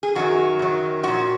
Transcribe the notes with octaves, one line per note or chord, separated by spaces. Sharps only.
G#4
F#2 D#3 F#3 F#4
F#2 D#3 F#3
A#2 F3 F#4